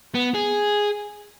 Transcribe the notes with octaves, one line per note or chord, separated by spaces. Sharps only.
B3
G#4